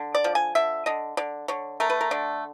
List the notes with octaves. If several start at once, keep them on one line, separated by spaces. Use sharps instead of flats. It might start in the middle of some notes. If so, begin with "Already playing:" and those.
Already playing: D3
D5
F3
G#5
D3 E5
D3 D#5
D3 D5
D3 C#5
A3 A#4
B4
A#4
D3 D5